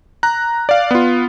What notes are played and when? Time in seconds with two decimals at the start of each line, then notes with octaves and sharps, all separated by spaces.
0.23 A#5 F#6
0.69 D5 F5
0.91 B3 F4